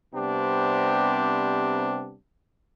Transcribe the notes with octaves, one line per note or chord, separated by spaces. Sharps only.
C3 G3 B3 C4 D4 G4